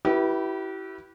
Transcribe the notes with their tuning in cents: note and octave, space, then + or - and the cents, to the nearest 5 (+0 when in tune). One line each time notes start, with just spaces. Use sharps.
E4 +0 G4 -35 B4 -25